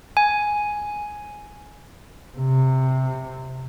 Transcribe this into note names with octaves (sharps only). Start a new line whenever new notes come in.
G#5
C3